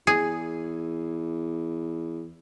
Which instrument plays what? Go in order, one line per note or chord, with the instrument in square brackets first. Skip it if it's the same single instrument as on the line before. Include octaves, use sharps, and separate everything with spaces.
[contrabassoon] E2 [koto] G#4